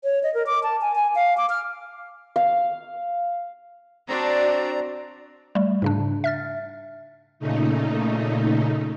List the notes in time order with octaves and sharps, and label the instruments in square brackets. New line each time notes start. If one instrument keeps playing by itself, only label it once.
[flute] C#5
D#5
A#4
D6
A5
G#5
G#5
F5
D6
F6
[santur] F5
[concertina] C4 A#5 [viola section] D4 F#4 [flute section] D5
[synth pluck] G3 A3
G#2 C#3 D4
E5 F6 A6
[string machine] A#2 C#3 A3 D#4